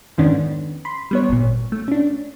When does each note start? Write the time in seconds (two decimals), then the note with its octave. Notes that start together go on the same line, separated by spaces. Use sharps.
0.18 F2 G#2 D#3 B3 C#4 D4
0.85 B5 C6
1.11 G3 B3 C#5
1.29 G#1 A#2
1.72 A3
1.88 C#4 D4